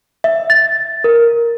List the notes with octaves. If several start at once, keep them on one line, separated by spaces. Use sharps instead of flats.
E5
A6
A#4